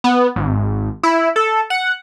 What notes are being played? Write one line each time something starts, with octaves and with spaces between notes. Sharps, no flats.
B3
G#1
E4
A4
F#5